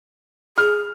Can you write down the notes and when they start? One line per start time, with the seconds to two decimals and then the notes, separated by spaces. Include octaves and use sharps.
0.58 G#4 F6